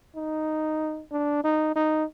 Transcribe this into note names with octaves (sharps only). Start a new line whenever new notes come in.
D#4
D4
D#4
D#4